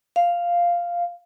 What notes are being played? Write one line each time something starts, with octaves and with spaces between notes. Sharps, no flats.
F5